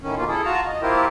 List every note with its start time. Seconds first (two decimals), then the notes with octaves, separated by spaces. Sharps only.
0.02 A2 D#3 C#4
0.16 B2 D#3 A#3 F4
0.28 E4 G#4 A4
0.45 F4 F#4 A5 A#5
0.67 D#5
0.82 A#3 C4 E4 F4 G4 A#4